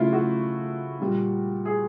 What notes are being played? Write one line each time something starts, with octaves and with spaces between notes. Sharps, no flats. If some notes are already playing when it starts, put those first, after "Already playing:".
Already playing: C#3 F#3 A3 E4 F4
F#4
A#2 G3
G#4